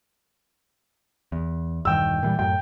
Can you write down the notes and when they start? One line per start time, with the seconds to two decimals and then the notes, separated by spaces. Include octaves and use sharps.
1.32 E2
1.85 E1 G2 D#3 G5 E6
2.23 A#2 E3 G3
2.39 F#2 A2 F#3 G5